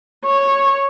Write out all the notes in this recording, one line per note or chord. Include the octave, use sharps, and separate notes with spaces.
C#5